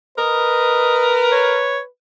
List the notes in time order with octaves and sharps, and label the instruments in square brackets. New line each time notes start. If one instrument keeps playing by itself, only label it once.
[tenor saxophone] A#4 [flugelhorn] B4 [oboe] D#5
[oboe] C#5